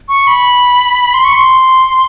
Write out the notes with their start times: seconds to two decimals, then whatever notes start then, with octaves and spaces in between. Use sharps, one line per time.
0.09 C#6
0.27 B5
1.14 C6
1.24 C#6
1.35 C6